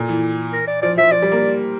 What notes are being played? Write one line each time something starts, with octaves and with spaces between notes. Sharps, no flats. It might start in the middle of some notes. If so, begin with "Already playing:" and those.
Already playing: A#2 A4
E3
A#4
D5
F3 D5
F3 E5
F3 D5
G3
A#3